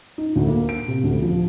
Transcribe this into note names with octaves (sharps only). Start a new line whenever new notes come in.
D#4
D2
A#3
D7
C3
D2
F3